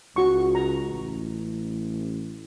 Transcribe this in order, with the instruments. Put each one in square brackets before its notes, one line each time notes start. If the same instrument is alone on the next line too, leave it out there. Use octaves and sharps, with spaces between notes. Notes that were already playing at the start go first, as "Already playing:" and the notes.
[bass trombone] C#2 [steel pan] F#4 C#6
[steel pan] A#5
[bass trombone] A1